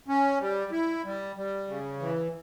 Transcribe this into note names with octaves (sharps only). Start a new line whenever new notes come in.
C#4
G3
E4
G3
G3
C#3
E3